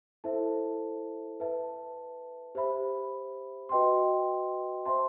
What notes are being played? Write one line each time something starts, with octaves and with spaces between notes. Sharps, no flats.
E4 A4 C5 E5 A5
B4 E5 A5
G4 C5 E5 B5
F#4 B4 D#5 G5 C6
C5 E5 A5 C6